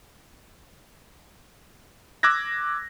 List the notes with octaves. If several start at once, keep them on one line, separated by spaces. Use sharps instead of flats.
D6 E6 F#6 G#6 A#6